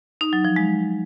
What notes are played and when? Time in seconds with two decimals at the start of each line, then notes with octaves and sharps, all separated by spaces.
0.21 D#4
0.33 F#3
0.45 F3
0.56 G#3